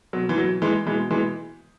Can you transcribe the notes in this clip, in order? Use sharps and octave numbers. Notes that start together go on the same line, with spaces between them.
B2 F#3
E3
F#3
E3 G#3
B2 E3 G#3
E3 G#3